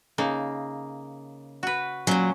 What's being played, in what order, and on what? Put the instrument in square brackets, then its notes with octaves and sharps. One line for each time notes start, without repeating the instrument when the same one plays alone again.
[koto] C#3 A#3 D#4
F#4 B4
[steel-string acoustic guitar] A#2 F#3 [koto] C#4